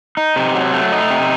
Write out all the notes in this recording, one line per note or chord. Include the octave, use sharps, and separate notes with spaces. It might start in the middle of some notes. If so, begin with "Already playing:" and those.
D#4
C3
F#3
A3
D#4
C3